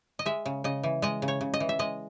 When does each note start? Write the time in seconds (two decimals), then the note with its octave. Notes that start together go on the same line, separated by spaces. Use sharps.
0.19 D#5
0.26 G#3 E5
0.46 C#3
0.64 C#3 D#5
0.83 E3
1.02 G#3 D#5
1.22 C#3
1.28 C#5
1.41 C#3
1.54 D#5
1.60 E3
1.69 E5
1.79 G#3 D#5